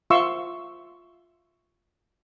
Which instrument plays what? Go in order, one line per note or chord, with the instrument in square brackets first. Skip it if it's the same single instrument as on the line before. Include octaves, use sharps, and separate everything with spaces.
[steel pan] F4 E5 F5 C6 C#6 E6